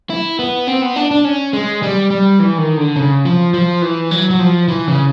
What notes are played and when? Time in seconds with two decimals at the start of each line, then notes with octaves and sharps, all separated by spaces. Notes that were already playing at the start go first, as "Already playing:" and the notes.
0.10 E4
0.39 B3
0.67 C4
0.82 B3
0.96 D4
1.11 D4
1.25 C#4
1.53 G#3
1.83 G3
2.10 G3
2.39 E3
2.58 D#3
2.77 D3
2.96 C#3
3.25 F3
3.54 F3
3.82 E3
4.11 F#3
4.30 F#3
4.39 F3
4.68 E3
4.88 C#3